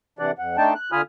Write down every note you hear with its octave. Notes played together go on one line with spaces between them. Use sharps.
C3 E3 D4 D5 F#5
F2 F#5
A3 D4 D#4 G5 A5
F#6
D3 F4 G#5 B5 D#6 F6